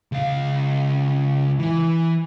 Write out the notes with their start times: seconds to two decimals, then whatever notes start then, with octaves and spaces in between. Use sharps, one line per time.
0.12 C#2 F5
1.59 E3